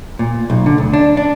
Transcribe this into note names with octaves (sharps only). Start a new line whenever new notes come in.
A#2
B1
D3
D2
D4
D4